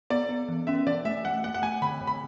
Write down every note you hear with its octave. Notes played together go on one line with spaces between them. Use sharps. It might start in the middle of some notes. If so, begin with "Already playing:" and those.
B3 D5
B3
E3
C#4 E5
E3 D5
A3 E5
A3 F#5
A3 F#5
F#5
A3 G#5
D3 B5
D3
B5